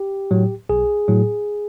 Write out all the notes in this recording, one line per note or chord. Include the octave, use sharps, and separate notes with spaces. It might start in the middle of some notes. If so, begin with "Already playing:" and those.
Already playing: G4
A2 F#3
B1 G#4
A2 F#3